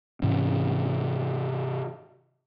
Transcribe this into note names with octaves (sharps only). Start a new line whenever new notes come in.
G#2 C3 E3 C#4